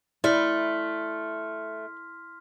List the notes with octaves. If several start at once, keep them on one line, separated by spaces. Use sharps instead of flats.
A3 E4 D5 C6 F6 B6